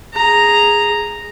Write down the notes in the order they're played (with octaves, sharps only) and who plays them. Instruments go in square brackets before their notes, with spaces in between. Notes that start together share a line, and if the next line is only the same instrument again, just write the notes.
[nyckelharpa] G#4 A#5